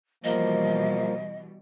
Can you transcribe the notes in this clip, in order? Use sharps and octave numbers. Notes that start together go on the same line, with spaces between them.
B2 E3 F3 G3 A#3 D#5